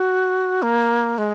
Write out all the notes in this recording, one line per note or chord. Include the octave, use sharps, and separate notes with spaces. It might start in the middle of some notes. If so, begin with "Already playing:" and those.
Already playing: F#4
A#3
G#3